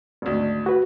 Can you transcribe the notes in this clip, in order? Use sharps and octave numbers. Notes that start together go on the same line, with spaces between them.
G#1 D2
F#4 B4